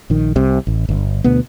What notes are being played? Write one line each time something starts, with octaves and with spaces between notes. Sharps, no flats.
A#1 D#3
C2 C3
A1
G1
D2 B2 B3